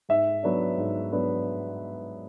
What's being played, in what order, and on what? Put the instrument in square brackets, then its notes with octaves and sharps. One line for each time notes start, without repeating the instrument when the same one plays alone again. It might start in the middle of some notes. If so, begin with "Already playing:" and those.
[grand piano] G#2 E5
F#3 B3 D4
G#2
F#3 B3 D4